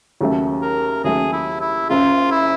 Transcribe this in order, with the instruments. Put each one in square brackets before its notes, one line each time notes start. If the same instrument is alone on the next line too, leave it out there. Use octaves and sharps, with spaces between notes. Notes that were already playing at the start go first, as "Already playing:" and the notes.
[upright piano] D#2 C#3 F#3 A3
[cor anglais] A#4
[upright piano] D#2 C#3 F#3 A3 [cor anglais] G#4
[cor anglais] E4
E4
[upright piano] F#1 F#2 C#3 [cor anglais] F4
[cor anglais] E4